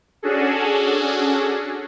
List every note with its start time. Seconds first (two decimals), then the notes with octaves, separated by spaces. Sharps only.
0.22 C#4 D4 F#4 G#4 A4